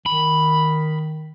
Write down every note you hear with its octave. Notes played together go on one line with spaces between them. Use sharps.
D#3 B5